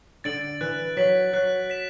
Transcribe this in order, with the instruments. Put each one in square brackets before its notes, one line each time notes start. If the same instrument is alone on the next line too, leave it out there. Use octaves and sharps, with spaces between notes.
[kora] D3 [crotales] A6 D7 F#7
[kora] E3 [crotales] F#6
[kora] F#3 [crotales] B6 F#7
[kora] F#3 [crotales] F#6
[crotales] B6 E7